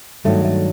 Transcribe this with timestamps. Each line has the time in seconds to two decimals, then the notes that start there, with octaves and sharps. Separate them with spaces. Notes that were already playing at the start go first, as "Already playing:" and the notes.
0.25 G2 D#3 F#3 A3
0.45 A3